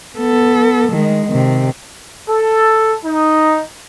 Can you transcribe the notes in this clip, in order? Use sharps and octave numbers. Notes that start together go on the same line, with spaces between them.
B3 A4
D#3 G#3
C3 D#3
A4
D#4